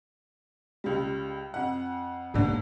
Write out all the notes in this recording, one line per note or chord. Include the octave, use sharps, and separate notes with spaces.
C#2 G3
F2 F#5
G1 G#2 D3 A#3